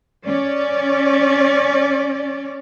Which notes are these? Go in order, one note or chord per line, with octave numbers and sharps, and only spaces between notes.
C#4 D5